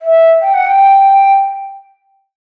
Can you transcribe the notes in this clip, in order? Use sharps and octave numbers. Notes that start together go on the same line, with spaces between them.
E5
G5
F#5
G5